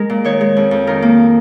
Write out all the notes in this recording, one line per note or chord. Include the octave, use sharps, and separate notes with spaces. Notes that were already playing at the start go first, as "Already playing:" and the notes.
Already playing: G#3 A#4
A#2
D#3 C#5
G#3
F2
F2
D#3 A#4
A#3